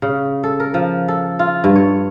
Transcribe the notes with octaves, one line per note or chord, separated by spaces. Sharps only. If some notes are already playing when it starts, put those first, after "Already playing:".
C#3
A4
A#4
F3
A4
F4
G2
C#5